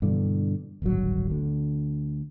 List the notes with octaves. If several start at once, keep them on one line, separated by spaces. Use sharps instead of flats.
G2 B2 D3 E3
D1 G#1 G2 F#3
D2 D3